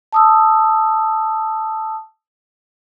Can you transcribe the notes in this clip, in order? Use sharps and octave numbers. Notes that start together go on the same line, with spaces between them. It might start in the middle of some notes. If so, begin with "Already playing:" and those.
A5 D#6 E6